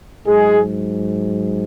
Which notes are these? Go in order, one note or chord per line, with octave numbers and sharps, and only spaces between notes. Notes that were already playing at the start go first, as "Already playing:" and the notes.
G#2 F#3 G#3 G#4